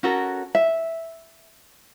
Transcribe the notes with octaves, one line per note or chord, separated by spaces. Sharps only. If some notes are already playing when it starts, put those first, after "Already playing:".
C#4 F#4 A4 A#4
E5